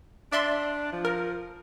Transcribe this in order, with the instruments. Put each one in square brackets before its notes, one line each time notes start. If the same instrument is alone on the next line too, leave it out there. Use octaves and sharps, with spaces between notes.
[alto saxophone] D4 [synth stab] D5 E5 C6
[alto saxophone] F3
[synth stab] A#4